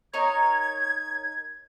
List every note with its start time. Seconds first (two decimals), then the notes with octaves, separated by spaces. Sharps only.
0.14 D#4 A#4 C#5 G#6